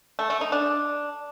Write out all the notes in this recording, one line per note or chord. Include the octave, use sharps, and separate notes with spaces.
A3
A3
D#4
D4